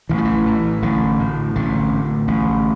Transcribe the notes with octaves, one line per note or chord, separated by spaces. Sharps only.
A1 E3
F3
E3
A2
A1 D3
A2
A1 D3
A2
A1